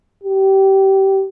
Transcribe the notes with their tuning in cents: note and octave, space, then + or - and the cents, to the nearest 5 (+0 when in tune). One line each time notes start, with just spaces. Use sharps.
G4 -20